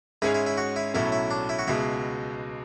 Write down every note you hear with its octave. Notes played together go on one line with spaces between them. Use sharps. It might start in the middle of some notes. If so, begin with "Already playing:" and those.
G#2 G#3 C#4 E4 G#4 C#5
E4
E4
F#4
E4
B1 A2 F#3 A3 C#4 E4
E4
D4
E4
F#4
C#2 B2 G#3 E4